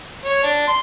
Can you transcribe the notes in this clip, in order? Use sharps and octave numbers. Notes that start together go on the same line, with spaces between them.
C#5
D4
C6